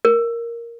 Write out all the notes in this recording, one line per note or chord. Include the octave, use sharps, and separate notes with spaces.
A#4